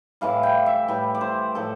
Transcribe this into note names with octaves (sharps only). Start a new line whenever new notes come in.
A2 E3 G3 F5
G5
E5
A2 E3 G3
D5
C5
A2 F3 A4